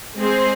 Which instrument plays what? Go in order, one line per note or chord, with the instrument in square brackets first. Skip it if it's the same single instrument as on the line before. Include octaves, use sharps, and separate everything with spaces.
[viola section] G#3 C4 G#4 C5